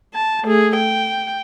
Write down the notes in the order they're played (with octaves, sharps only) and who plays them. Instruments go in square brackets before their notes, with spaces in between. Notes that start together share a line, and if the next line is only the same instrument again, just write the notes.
[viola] A5
A3 G#4
G5